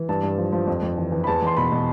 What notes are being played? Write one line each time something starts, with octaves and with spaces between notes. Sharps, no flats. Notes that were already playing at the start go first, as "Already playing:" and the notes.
Already playing: E3
G2 A5
G2
F3
F3
F2
F2
E3
E3
B5
E2 A5
E2 C6
B2 B5
B2